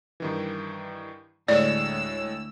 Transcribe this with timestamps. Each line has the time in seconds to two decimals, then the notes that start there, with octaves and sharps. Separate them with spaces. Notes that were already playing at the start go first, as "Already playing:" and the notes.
0.20 G2 D#3 E3
1.48 D2 A2 G#3 C#5 D5 E6